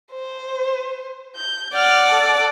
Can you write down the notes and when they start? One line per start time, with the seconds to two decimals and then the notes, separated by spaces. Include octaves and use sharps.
0.11 C5
1.36 G6
1.76 D5 F#5 F6
2.09 A4